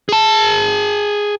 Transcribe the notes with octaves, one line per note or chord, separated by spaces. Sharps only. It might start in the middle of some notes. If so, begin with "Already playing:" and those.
G#4 A5